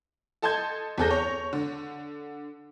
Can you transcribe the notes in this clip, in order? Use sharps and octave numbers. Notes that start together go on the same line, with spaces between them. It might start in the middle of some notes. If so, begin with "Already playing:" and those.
A4 D#5 A5 C6 G6 G#6
E2 C4 G#4 A4 G6 A#6
C#5
D3